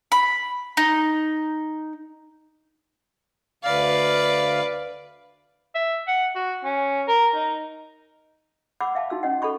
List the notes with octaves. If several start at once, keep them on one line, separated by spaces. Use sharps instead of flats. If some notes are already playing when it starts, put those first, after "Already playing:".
B5
D#4
D2 B4 D5 F5
E5
F#5
F#4
C#4
A#4
D#4
F#5 B5 D6 E6
E5 F5 A5
D#4 F#4 E6
C#4 D#5 F#5
A4 D#5 B5 C#6